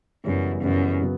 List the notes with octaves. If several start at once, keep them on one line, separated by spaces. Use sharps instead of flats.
F#2 C#3 E3 G3 B3
F#2 C#3 E3 G3 B3
C#3 F#3 B3